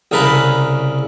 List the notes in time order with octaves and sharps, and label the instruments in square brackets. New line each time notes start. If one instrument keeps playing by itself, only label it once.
[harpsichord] C2 C#3 A#4 B4 A5 B5